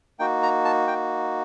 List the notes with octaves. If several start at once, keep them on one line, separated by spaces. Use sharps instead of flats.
A#3 D#4 F#4 G5
A#5
A5
G5